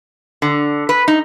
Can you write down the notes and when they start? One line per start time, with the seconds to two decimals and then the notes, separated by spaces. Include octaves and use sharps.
0.42 D3
0.89 B4
1.08 D#4